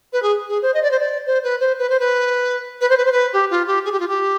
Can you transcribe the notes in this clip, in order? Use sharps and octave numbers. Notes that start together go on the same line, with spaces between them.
B4
G#4
G#4
C5
D#5
D5
C5
D5
C5
B4
C5
B4
C5
B4
B4
C5
B4
C5
B4
G4
F4
G4
G#4
G4
F4
G4